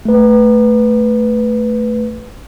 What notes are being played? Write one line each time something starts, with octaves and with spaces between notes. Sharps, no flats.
A3 B4